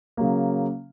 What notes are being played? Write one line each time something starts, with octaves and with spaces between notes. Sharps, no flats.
C#3 F#3 A#3